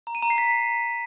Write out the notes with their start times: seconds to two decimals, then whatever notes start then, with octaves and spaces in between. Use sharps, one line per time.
0.07 A#5
0.15 D#7
0.23 A#5
0.30 C7
0.38 B6